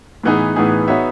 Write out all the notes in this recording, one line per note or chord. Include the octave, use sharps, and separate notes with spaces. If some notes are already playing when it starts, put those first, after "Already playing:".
A2 E3 B3 D#4 G#4
A2 E3 B3 D#4 G#4
B3 D#4 F#4 C#5 E5